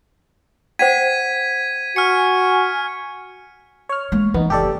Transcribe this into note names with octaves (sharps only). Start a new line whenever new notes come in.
C5 F#5 G5 G#6 B6 D#7
F#4 G#5 F6 C#7
C#5 F6
G#3 A#3
E3 B3 D#4
F#1 G4 A4 D5